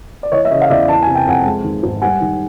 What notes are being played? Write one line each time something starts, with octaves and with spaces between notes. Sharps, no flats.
D5
E3 C#5 D#5
E5
C#3 C#5 D#5
F5
E2 D5 E5
E3 A5
C3 G#5
G5
F2 F#5 G#5
G#3
D#3
G#2
G3 F#5 G#5
D#3